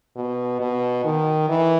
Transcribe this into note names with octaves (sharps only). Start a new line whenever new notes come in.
B2
B2
D#3
E3